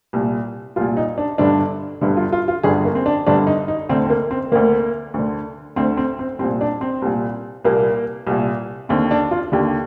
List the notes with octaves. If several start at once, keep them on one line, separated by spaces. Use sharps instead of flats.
C2 A#2
C2 A#2 F4
D#4
D4
G1 G2 D3 D4
G1 G2 D3
F4
F4
F4
G1 G2 D3 G#4
A#3
C4
D4
G1 G2 D3 D4
D#4
D#4
D2 D3 C4
C4
A#3
C4
D2 D3 A#3
D2 D3
D2 D3 C4
C4
C4
C2 A#2 C4
D4
C4
C2 A#2
C2 A#2 A#3
C2 A#2
D#2 D3 C4
D4
F4
D#2 D3 G4